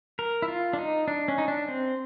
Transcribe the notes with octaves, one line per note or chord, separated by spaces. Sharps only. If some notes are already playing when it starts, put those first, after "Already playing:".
A#4
E4
F4
D4
D#4
D4
C#4
D#4
D4
C4